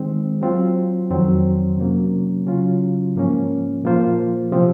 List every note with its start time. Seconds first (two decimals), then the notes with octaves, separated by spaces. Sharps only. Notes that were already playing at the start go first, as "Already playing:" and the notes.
Already playing: D#3 G#3 C4
0.41 F#3 C4 F4
1.10 F2 D#3 F#3 C4
1.78 C3 F#3 A#3 C#4
2.47 C#3 F#3 C#4 F4
3.16 G#2 F3 A#3 C#4
3.84 A#2 F3 A#3 F4 C5
4.52 C3 F3 C4